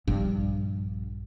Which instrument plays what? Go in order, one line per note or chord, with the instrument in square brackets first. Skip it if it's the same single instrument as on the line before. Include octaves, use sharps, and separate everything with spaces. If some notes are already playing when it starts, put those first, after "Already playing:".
[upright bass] A#1 [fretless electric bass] G2